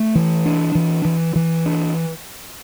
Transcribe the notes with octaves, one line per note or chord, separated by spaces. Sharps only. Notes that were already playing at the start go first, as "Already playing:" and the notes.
Already playing: A3
E3
D4
E3
E3
E3
D4